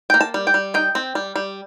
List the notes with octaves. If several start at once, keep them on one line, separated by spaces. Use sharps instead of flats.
A#3 G5
A5
G3
G5
G3
D#4 G5
C4
G3
G3